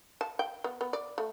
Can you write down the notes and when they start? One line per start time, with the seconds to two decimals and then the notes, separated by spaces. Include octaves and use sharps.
0.21 A5
0.39 G5
0.64 B3
0.81 B3
0.93 D5
1.18 A3